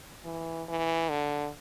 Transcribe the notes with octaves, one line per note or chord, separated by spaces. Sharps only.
E3
E3
D3